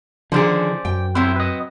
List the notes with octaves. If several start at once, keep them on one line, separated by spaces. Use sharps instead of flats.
D3 D#3 F3 C#4 G#4 C5 D5
F#2 G5
F#3 C4 E4 G4
B4 D#5